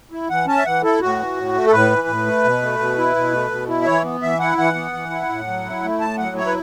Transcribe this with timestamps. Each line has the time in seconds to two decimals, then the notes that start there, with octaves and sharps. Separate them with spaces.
0.12 E4
0.29 E3 F#5
0.47 C#4 A5
0.57 E5
0.66 E3 F#5
0.83 E4 A4
1.01 A2 F#4
1.18 E3
1.36 A2
1.54 A3
1.67 A4
1.72 A2 B4
1.91 E3
2.08 A2
2.26 A3
2.44 B2
2.62 A3
2.79 B2
2.98 E4
3.16 B2
3.33 A3
3.51 B2
3.68 E4
3.82 E5
3.86 E3 C#5
4.04 B3
4.22 E3 E5
4.40 E4 F#5
4.58 E3 F#5
4.75 B3
4.93 E3
5.11 E4
5.29 A2
5.48 F#3
5.65 E4
5.83 A3
6.00 A2 A5
6.18 F#3 F#5
6.37 E4 C#5
6.47 B4